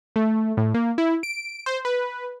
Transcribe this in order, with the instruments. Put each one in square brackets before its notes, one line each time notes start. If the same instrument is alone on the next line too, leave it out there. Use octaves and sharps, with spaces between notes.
[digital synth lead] A3
A2
A#3
E4
D7
C5
B4